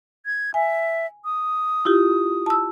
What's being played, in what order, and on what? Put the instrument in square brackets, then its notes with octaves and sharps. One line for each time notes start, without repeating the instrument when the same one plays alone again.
[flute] G#6
[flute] E5 [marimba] G#5
[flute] D#6
[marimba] E4 F4 G4
A5 E6